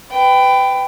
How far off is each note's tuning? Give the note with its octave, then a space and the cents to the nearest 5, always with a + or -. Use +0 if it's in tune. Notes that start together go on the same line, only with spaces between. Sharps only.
B4 +25 G5 +0